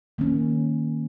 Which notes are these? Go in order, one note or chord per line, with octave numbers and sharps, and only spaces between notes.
D#3 A#3 C#4